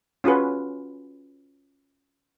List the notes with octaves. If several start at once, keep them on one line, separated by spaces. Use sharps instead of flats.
C#4 F4 F#4 G#4 B4